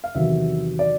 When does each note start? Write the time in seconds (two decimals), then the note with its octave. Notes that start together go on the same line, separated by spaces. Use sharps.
0.04 F5
0.15 E2 C3 D#3 F#3 E5
0.79 D5